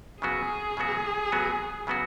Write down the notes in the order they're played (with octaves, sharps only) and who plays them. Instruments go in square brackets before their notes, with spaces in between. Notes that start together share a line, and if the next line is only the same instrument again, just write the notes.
[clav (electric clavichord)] C#3 F#3 B3 F#4 [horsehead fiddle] G#4
[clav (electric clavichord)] C#3 F#3 B3 F#4
C#3 F#3 B3 F#4
C#3 F#3 B3 F#4